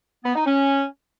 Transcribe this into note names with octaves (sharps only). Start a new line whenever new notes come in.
B3
D#4
C#4